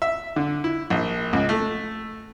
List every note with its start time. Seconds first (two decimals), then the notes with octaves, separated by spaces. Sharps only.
0.02 E5
0.36 D3
0.64 E4
0.90 A#1
1.33 C#2
1.49 A3